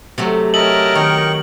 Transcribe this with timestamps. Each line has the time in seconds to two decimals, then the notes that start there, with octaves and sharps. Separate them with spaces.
0.18 C3 F#3 A3
0.54 A#4 C#5 D#5 E5 G5 A5 F#7
0.95 D#3 D#4 C#6